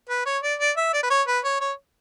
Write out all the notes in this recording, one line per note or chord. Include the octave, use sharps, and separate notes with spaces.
B4
C#5
D5
D5
E5
D5
B4
C#5
B4
C#5
C#5